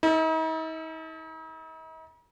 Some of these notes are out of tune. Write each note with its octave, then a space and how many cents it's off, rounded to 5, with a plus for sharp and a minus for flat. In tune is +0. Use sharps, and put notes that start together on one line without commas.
D#4 +45 A4 +10